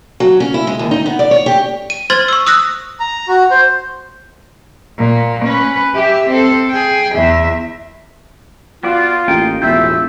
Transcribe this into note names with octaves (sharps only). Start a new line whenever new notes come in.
F#3
C#4
E4
G#3
D#2
D#4
B3
D5
C#5
G4
D#7
C5 C6 F6 G#6 A6
C#6 E6
D#6 E6 F#6 A#6
A#5
F#4
C5
A#2
C#4 B4
G4 E5
C4 A4
G#4 G5
E2 E5
B3 F4 F#4 D5
A1 A#3 D#4 G5
E1 A2 E3 A3 F4 E5 G6